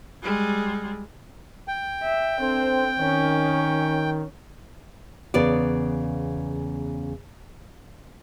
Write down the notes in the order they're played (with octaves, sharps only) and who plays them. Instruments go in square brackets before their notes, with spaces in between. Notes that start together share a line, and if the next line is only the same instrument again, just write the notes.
[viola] G3 G#3
[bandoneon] G5
[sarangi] E5
[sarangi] C4 [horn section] D4 A4 C5
[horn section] D#3 [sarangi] C#4
[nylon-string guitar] E2 C#3 B3 D5